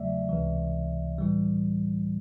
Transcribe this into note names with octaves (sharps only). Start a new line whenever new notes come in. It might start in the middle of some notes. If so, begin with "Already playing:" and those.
Already playing: E2 C#3 F#3 A3 D5 E5
C#2 C3 E3
A2 E3 G3